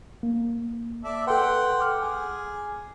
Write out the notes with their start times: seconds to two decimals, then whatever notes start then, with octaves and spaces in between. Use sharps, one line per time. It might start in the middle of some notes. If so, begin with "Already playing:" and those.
0.23 A#3
1.04 A4 D5 E5
1.27 A4 B4 F#5 G5 C6
1.80 D6 F6
2.02 G#4